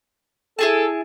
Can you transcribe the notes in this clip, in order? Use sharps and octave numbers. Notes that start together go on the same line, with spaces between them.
E4 G#4 A4 A5